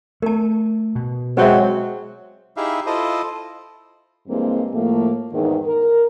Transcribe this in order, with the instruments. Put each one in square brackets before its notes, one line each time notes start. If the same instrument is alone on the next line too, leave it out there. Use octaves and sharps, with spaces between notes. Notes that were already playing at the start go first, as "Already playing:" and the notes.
[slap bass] A3 [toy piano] A#4 A5
[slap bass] B2
[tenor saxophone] F#3 [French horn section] G#3 C4 [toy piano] B4 C#5 E5
[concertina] D#4 E4 G4 G#4 E5 F5
E4 F4 A4 C5 D#5
[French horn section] G2 E3 G#3 A#3 C4
A2 F3 A3 A#3
E2 G#2 D#3
A#4